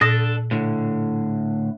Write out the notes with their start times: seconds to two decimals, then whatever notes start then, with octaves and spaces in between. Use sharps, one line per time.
0.01 A#2 D4 A4 D#6 A#6
0.51 A2 D3